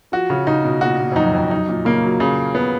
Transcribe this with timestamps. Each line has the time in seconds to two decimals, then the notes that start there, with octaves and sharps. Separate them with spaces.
0.12 F3 F#4
0.30 C#3
0.47 C#3 D#4
0.64 B2
0.81 A#2 F#4
0.99 A#2
1.12 F2
1.16 F#2 D#4
1.33 F2
1.51 F#2 D#4
1.69 A#2
1.85 C#3 A#3
2.02 F#3
2.20 C#3
2.55 B3